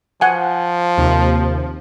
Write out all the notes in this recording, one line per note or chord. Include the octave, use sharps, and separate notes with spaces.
F3 F#5 G#5
D#2 C3